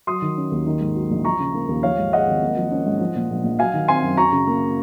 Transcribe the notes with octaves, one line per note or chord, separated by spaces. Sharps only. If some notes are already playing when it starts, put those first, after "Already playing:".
F#3 C6 D#6
D#3
C#4
D#2
D#3
G#2
F#3
A#1
F3 A#5 C#6
C#3
A#3
D#2
F3 C#5 F5
G#2
G#3 D#5 F#5
G#1
A#3
F3
C#4
G#2
F3
A#2
A#1
A#1
F#3 F5 G#5
D#3
C4 G#5 C6
F#2
F#3 A#5 C#6
C#3
A#3